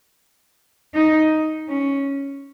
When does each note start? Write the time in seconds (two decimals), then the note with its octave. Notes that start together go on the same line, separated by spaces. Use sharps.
0.95 D#4
1.68 C#4